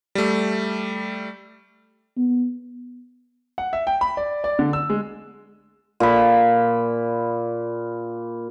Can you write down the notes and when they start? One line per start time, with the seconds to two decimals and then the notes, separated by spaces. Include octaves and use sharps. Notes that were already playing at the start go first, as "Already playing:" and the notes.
0.15 G3 A3
2.17 B3
3.58 F#5
3.73 E5
3.87 G5
4.01 B5
4.17 D5
4.44 D5
4.59 D3
4.73 E6
4.90 G#3
6.00 A#2 B5